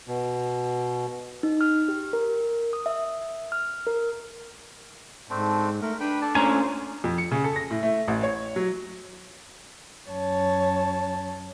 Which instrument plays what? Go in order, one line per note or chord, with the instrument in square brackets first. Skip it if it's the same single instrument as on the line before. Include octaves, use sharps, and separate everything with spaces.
[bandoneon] B2
[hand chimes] D#4
F6
G4
A#4
D#6
E5
F6
A#4
[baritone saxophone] G#2 [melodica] A3 C4 D4
[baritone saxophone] A3 [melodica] A#4
[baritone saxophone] D4 [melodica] B4 G5 B5
[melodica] A4 D5 A5
[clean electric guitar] A#2 A3 A#5 [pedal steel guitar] C#4 G#5 [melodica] C5
[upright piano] F2
C#7
C#3
A4
A#6
A2
A3
A1
C#5
F#3
[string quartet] F#2 C#5 A5